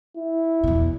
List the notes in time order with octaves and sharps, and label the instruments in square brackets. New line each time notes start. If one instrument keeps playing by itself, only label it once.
[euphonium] E4
[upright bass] E2 B2